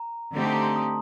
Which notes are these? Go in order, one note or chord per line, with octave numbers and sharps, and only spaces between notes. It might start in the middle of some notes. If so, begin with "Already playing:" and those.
Already playing: A#5
D3 A3 C4 D#4 G4
A5
A#5
C6
D#6